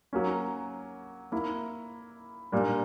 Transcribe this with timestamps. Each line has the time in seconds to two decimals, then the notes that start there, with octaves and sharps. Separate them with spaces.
0.13 F#3 A#3 C#4
1.32 A#3 E4 A#4
2.52 A#2 G3 A#3 D4